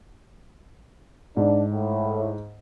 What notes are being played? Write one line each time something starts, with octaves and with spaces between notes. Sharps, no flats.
G#2 D4
A2